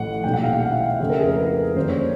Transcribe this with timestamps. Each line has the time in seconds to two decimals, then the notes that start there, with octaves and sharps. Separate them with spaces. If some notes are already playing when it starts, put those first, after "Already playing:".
Already playing: A1 A2 F3 A3 F#5
0.24 B1 A#2 G3 G5
0.34 F#5
0.43 F5
0.53 F#5
0.63 F5
0.75 E5
0.88 F5
1.00 F2 C#3 F3 A3 E5
1.10 A#4
1.19 G#4
1.28 A#4
1.39 B4
1.76 F#2 D3 G3 A#3 C5
1.89 C#5